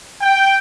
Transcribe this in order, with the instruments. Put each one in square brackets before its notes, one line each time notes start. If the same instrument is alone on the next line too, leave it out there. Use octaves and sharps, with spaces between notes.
[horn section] G5